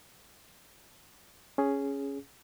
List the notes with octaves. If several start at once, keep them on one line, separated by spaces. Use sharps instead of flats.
C#4 G#4